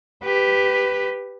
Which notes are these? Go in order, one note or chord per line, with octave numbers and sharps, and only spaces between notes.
G4 B4